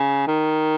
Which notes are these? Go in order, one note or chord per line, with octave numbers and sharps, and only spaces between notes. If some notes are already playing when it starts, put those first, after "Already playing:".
Already playing: C#3
D#3